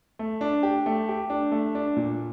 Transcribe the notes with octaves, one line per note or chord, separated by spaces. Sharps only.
A3
D4
G4
A3
G4
D4
A3
D4
A#2